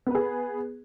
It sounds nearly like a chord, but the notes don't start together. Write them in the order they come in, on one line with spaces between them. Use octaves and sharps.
B3 B4 G#4